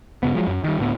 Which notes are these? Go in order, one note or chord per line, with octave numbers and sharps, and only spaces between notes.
G2 C#3 B3
F3 F#3 G#3
F#2
D#3 G3
D2 A2 A#3 B3